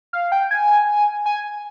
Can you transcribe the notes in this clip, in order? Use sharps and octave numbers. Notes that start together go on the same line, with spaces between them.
F5
G5
G#5
G#5